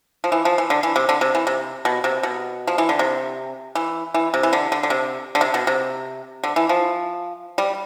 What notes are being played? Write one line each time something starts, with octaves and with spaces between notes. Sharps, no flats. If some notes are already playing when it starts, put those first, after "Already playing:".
F3
E3
F3
E3
D3
E3
C3
D3
C3
E3
C3
B2
C3
B2
F3
E3
D3
C3
E3
E3
C3
E3
D3
D3
D3
C3
D3
C3
B2
C3
D3
E3
F3
G3